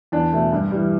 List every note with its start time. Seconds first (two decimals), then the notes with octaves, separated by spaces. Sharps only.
0.12 E2 D4
0.33 B2 A3
0.52 G2
0.70 E3 G3